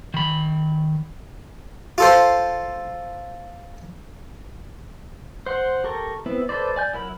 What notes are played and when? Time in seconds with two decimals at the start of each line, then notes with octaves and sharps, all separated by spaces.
0.14 D#3 B5
1.98 F4 A4 C5
5.46 C5 F#5 C6
5.84 G4 A4 A#4 C#6
6.26 B3 C4 E4
6.49 A4 B4 C5 D5
6.76 D5 G#5 G6
6.93 F#3 E4 A#4 B5